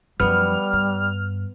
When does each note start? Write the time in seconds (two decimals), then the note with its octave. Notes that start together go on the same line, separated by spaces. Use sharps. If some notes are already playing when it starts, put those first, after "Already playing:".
0.20 F#2 F3 G3 B3 F6
0.73 G2